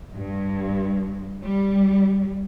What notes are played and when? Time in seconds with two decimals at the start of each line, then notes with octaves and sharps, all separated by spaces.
0.12 G2
1.45 G3